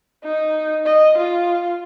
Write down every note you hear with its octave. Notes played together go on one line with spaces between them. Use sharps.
D#4
D#5
F4